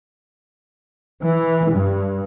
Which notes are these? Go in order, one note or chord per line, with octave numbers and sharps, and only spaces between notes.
E3
G2